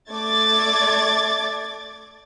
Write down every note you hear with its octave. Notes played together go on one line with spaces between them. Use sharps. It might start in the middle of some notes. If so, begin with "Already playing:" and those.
A3 D5 D6 G#6 A6